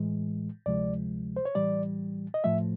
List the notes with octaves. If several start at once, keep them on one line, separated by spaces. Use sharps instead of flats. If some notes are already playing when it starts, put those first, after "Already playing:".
Already playing: A2 E3 G#3
D2 C3 F3 G#3 D5
C5
C#5
A2 E3 G3 D5
D#5
A2 F3 A3 E5